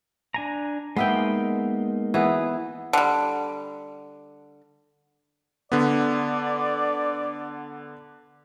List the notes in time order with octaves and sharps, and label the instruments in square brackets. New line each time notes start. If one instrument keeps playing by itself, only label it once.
[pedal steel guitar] D4 G#5 A#5
[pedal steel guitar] G#3 A#3 D#4 [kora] B3 E5 G5
[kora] E3 B3 G#4
[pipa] D3 G3
[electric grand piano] D3 B3 [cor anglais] D5